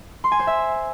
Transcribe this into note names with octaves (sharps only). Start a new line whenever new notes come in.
C6
G#5
C5
E5